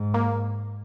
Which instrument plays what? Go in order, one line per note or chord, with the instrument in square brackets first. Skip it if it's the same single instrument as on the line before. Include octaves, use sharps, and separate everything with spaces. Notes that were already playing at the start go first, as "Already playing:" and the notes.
Already playing: [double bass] G#2
[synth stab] A#3